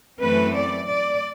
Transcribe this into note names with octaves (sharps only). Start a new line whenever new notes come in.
F#2 E3 A3 C4 B4
D5
D5